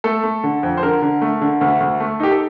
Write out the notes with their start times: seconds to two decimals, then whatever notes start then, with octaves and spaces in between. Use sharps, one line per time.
0.04 A3 A4
0.24 A3
0.44 D3
0.63 F2
0.77 C5
0.83 D3 A#4
1.02 D3
1.22 A3
1.41 D3
1.61 D2
1.80 D2
2.00 A3
2.20 D#4 G4
2.31 A4